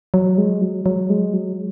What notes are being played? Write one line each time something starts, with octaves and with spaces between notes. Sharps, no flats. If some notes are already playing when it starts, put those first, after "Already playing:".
F#3
G#3
F#3
F#3
G#3
F#3